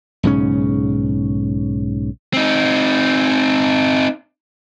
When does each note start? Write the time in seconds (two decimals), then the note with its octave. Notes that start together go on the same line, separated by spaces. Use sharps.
0.23 B1 G#2 C#3 C#4
2.33 C4 D#4